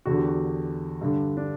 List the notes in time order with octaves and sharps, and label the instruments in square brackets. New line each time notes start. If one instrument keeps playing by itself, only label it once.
[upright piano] E2 D3 F#4
G4
F#4
G2 D3
D4